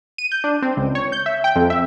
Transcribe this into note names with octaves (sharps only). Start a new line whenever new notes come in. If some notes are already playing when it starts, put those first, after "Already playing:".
D#7
G6
D4
C4
C#2
C#5
G6
E5
G5
F2
E5